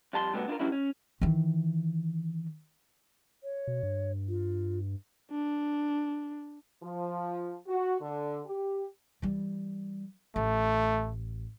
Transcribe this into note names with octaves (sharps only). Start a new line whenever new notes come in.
F2 G3 A5 C6
C3 G3 A3 B3 F#4
D4 E4 F4 A#4
E3 F#3 G3 C#4 D4 E4
C#4
D#3 E3
C#5
B2
G2
F4
D4
F3
F#4
D3
G4
E3 G3
A1 A3